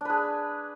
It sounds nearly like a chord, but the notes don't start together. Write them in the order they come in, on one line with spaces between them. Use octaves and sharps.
D4 B4 G#4